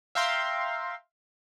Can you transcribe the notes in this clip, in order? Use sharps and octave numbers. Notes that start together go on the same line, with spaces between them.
E5 F5 G5 A#5 C6